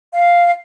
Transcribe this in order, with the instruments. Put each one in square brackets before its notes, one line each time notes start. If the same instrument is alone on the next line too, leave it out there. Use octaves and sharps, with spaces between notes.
[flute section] F5